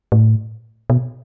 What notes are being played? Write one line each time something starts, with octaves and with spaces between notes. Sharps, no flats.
A2
B2